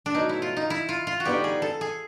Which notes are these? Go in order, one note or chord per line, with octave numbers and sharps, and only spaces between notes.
D4
B2 F#3 A3 D#4
E4
F4
D#4
E4
F4
F4
F#4
D3 G3 B3 D#4 G4
G#4
A4
G#4